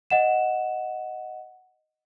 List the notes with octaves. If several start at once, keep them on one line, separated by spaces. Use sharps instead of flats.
D#5 F#5 E7